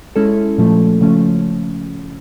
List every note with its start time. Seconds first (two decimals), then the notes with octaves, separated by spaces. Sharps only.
0.16 G#3 C#4 E4 A4
0.58 A#2 F3 A3
1.01 C#3 F3 A3 C#4